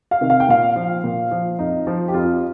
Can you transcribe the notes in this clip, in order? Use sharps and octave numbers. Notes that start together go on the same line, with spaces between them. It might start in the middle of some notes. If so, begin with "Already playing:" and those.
F5
C3 D#3
F5
G5
A#2 F5
F3
A#2
F3
F2 D#4
F3
G4
F2 F4